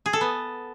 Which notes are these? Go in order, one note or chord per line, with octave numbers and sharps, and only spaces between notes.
G#4
A4
B3